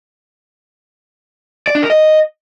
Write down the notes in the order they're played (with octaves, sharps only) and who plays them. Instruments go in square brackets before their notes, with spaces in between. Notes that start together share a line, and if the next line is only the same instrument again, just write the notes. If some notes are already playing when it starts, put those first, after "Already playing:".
[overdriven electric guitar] D5
D4
A#4
D#5